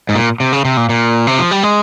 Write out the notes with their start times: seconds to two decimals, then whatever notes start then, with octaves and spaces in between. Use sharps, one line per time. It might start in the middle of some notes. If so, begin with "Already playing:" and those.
0.09 G#2
0.15 A#2
0.40 C3
0.53 C#3
0.65 C3
0.77 A#2
0.89 A#2
1.27 C3
1.39 F3
1.51 G3
1.63 G#3